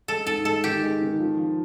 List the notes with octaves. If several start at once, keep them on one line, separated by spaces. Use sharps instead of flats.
G#3 A4
G#2 A4
G#3 A4
D#3 G4
G#3
D#3
F3
F3